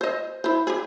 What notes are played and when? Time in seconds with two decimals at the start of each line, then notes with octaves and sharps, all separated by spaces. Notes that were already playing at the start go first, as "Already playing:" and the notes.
0.01 C5 D#5
0.44 E4 C5
0.67 G4 G#4